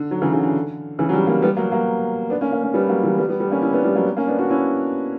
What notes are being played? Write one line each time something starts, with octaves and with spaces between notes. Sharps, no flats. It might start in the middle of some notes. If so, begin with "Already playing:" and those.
Already playing: D3
D3 F#3
C#3 E3
C#3
D3
C#3 E3
F#3
E3 G3
F#3 A#3
G3 B3
F#3 A#3
F#3 A#3
B3 D4
A#3 C#4
A#3 C#4
A#3 C#4
G3 B3
F#3 A#3
E3 G3
G3 B3
G3 B3
G3 B3
D4
A#3 C#4
C#4 E4
B3 D4
G3 B3
F#3 A#3
A#3 C#4
B3 D4
D4 F#4
C#4 E4